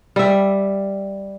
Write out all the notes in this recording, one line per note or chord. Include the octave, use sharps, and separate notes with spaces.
G3 E5